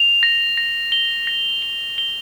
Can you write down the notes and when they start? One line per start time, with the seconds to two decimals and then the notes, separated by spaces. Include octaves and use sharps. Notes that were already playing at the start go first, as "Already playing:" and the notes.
Already playing: F7
0.23 A#6
0.57 A#6
0.92 G7
1.27 A#6
1.62 G7
1.98 G7